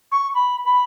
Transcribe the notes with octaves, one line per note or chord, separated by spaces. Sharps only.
C#6
B5
B5